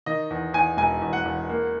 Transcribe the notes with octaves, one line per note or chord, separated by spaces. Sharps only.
D#3 D#5
E2
E2 G#5
E1 G#5
E2
F#5
E2
A#3